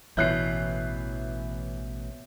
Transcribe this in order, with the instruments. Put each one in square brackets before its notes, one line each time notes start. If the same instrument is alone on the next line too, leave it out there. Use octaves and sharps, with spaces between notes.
[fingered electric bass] A1 B2 [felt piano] E3 F#6 C7 [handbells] C#5 E5 G6